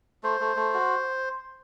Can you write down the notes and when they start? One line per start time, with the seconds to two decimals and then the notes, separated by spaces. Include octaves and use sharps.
0.23 A3 C5
0.40 A3
0.56 A3
0.74 F#4